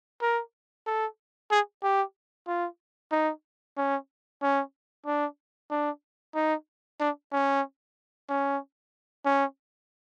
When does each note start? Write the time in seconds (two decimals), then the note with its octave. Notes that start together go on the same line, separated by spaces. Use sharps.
0.22 A#4
0.87 A4
1.51 G#4
1.83 G4
2.47 F4
3.12 D#4
3.77 C#4
4.42 C#4
5.06 D4
5.71 D4
6.35 D#4
7.00 D4
7.32 C#4
8.29 C#4
9.26 C#4